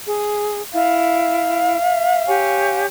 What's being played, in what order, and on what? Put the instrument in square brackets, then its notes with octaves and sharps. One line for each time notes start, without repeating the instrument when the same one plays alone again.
[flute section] G#4
[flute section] E4 [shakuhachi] F5
[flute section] E5
G4 C#5 G#5